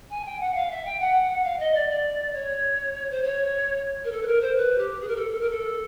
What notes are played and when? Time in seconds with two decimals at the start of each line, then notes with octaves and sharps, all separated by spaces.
0.11 G#5
0.25 G5
0.40 F#5
0.55 F5
0.71 E5
0.85 G5
1.00 F#5
1.44 F5
1.59 D#5
1.75 D5
1.89 D5
2.33 C#5
3.11 C5
3.23 C#5
4.04 A#4
4.12 A4
4.23 B4
4.27 A#4
4.41 C5
4.56 B4
4.78 G4
5.01 G#4
5.08 A#4
5.16 A4
5.31 A4
5.41 A#4
5.50 A4